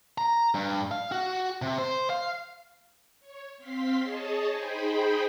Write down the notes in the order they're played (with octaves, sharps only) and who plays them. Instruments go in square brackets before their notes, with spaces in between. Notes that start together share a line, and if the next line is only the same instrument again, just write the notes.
[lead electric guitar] A#5
G2
F5
F#4
C3
C5
F5
[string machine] C#5
C4 F5 C6 B6
G#4 C#5 D#5 A5
D#4 G#4 C5 G5 B5